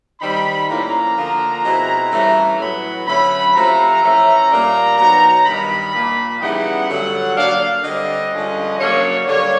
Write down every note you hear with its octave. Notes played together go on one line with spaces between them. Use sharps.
D#3 G3 C4 D#4 B5
A2 F3 A#3 C#4 A#5
D3 F3 A#3
B2 G#3 C4 E4
G2 E3 A3 C#4
A2 F#3 B3 B5
D3 F#3 A3 C#4 B5
C3 F3 A3 C4 A#5
E3 A3 C#4
A#2 G3 A#3 D4
B2 F#3 B3 D#4 A#5
G2 D#3 G3 B5
A#2 F3 A#3
C#3 E3 G3 B3 D#4 F#5
G2 D3 F#3 A3
D3 F#3 A#3 D4 F5
D3 G3 C4 D#5
G2 D3 F3 G#3 C#4
C#3 F#3 A#3 D4 C#5
G2 D3 G3 A#3 C#5